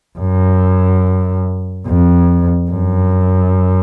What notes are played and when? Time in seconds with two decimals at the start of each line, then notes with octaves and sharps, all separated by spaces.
0.18 F#2
1.87 F2
2.71 F#2